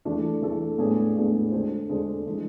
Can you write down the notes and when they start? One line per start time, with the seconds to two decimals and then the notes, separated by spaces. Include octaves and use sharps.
0.05 E3 A3 D4 A4
0.42 E3 A3 D4 A4
0.78 A2 G#3 B3 D4 G#4
1.16 A2 G#3 B3 D4 G#4
1.52 D3 G#3 D4 A4 C5
1.89 D3 G#3 D4 A4 C5
2.26 E3 G#3 D4